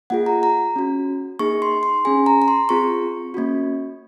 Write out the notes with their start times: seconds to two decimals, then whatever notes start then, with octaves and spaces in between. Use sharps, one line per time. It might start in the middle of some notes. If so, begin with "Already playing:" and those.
0.10 A#3 F4 G#4 F#5
0.26 A#5
0.43 A#5
0.76 C#4 F#4
1.39 A#3 D#4 G#4 C#6
1.62 C6
1.83 C6
2.05 C#4 G#4 G#5
2.26 A#5
2.42 A#5
2.48 C6
2.69 C4 F4 G#4 C#6
3.34 A#3 C#4 F#4